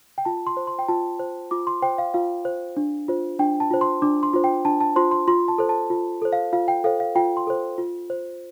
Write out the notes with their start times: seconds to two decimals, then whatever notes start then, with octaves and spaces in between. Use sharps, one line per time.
0.18 G5
0.25 F4 A5
0.47 C6
0.57 C5
0.67 C6
0.79 G5
0.88 F4 A5
1.19 C5
1.51 F4 D6
1.67 C6
1.82 C5 G5
1.98 F5
2.14 F4 F5
2.45 C5
2.77 D4
3.08 F4 C5
3.39 D4 G5
3.60 A5
3.71 F4 C5
3.81 C6
4.02 D4 D6
4.23 C6
4.33 F4 C5
4.44 G5
4.65 D4 A5
4.80 A5
4.96 F4 C5 C6
5.11 C6
5.27 F4 C6
5.48 A5
5.58 A4 C5
5.69 A5
5.90 F4
6.22 A4 C5
6.33 F5
6.53 F4 F5
6.68 G5
6.84 A4 C5 F5
7.00 F5
7.16 F4 G5
7.37 C6
7.47 A4 C5
7.78 F4
8.10 C5